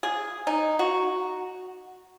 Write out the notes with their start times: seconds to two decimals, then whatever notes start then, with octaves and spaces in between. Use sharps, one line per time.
0.03 G#4
0.47 D#4
0.79 F#4